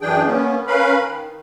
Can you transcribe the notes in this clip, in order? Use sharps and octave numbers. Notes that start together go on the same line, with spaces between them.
F#2 E3 D4 G#4 G5
A#3 B3 C#4
C#4 A#4 B4 F5 B5
D#3